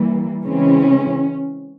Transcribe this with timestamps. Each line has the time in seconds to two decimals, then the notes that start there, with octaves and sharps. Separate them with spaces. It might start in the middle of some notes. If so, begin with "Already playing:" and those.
Already playing: E3 G3 A#3
0.45 C#3 E3 G#3 C4 C#4